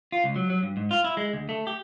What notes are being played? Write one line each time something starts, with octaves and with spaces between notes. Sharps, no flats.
F4
C#2
F#3
F#3
G2
G#2
F4
E4
G#3
D2
A3
G4